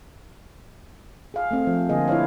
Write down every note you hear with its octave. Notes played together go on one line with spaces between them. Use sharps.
G#4 F5
A3 C4
F3
D3 A#3 F4 G#4 D#5
E4 C5 C#5 F5